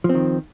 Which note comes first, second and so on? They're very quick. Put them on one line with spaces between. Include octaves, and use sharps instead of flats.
F3 C4 D#3